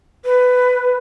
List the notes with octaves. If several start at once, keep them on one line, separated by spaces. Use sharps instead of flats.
B4